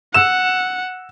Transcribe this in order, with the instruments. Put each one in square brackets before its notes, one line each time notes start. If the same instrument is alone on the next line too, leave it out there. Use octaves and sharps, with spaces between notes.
[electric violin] F#5 [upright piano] E6 E7